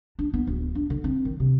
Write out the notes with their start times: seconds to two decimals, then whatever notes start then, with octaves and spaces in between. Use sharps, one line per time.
0.19 D4
0.34 B3
0.47 D1
0.75 D4
0.90 D3
1.04 C4
1.25 D#3
1.40 C3